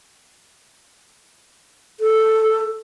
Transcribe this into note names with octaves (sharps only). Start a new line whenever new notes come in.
A4